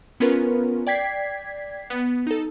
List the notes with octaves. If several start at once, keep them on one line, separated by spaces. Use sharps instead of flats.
B3 C#4 F4 A#4 B4
D5 G5 G#6 B6 C7
B3
D#4 A4